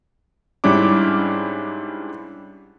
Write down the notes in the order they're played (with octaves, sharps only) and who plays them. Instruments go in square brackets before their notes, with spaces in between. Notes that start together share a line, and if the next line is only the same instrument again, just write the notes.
[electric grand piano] G#2 G3 C#4 D4 E4 D6